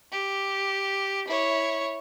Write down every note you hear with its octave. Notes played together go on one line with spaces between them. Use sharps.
G4
E4 C#5